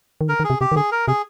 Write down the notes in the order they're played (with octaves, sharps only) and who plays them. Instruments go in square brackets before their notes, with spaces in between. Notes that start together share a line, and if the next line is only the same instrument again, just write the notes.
[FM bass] D#3
[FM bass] D3 [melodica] A#4
[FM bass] D#3
[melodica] G#4
[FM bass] C3
[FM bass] C3 [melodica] G4
[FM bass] D#3
[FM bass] D3 [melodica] G#4
[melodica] A#4
[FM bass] C3 [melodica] G#4